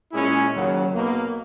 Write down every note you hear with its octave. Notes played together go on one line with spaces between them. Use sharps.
A#2 G#3 C#4 E4 G#4
D#2 C#3 F#3
B1 B2 A#3